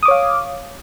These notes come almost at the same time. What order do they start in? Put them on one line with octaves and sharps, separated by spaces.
D#6 D6 C#5 F5